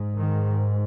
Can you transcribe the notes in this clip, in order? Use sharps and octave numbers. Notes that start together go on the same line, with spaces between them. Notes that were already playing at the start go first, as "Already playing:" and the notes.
Already playing: G#2
D#3